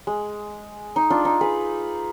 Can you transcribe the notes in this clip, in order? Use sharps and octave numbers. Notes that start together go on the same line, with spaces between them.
G#3
D#4
D4 F4
D#4
G#4 B4